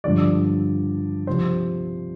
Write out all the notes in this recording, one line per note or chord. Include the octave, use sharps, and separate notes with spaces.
G2 D3 F3 D5
C3 F3 C5